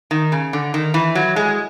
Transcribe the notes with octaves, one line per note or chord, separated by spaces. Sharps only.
D#3
C#3
D3
D#3
E3
F#3
G#3